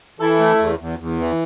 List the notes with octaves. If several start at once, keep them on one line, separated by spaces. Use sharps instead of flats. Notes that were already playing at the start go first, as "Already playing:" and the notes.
E3 E4 A4
A3
E2
E2
E2
E3